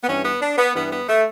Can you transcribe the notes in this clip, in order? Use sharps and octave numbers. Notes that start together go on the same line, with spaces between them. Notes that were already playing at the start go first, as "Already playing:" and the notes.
B3
G2 E3 G3 C#4
B3
D4
B3
G2 E3 G3 B3
B3
A3